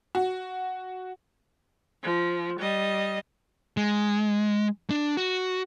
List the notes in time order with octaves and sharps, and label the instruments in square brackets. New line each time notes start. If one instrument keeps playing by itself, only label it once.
[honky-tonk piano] F#4
[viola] F3
G3 D#5
[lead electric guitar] G#3
D4
F#4